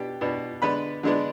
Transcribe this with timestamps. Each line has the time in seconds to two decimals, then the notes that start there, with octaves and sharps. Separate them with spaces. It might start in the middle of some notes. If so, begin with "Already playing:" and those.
Already playing: B2 B3 D4 G4 G5
0.21 B2 B3 D4
0.62 D3 G#3 B3 D4 B4 B5
1.03 D3 G#3 B3 D4